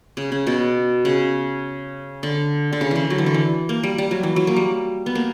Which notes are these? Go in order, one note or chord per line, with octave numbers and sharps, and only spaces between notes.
C#3
C#3
B2
C#3
D3
D3
C#3
D3 E3
F#3
E3
D3
E3
A#3
G3
G3
F#3
E3
F#3
A#3
G3
B3
A#3